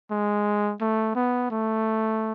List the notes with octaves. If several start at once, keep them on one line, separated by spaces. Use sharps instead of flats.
G#3
A3
B3
A3